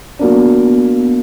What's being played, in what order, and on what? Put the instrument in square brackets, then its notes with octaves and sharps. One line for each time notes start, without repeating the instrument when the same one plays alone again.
[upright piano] F#3 A#3 D4 [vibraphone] B3